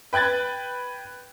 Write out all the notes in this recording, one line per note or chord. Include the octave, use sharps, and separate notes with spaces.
B4 G5 F#6 G#6 A6